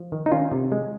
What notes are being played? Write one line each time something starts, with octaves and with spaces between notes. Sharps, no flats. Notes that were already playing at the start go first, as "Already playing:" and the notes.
Already playing: F3
D#3
D#4
D#3 C#4 F4
C3
G#3